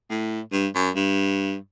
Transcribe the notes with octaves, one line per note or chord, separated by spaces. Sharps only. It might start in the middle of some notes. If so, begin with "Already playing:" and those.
A2
G2
F#2
G2